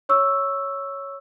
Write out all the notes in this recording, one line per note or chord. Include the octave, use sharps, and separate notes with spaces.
C#5 C#6 E6